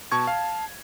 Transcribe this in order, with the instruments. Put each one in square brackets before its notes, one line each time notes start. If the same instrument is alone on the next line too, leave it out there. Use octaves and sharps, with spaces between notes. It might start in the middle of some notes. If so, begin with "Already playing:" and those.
[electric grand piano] B2 C#6 G#6 [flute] A5
[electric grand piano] F5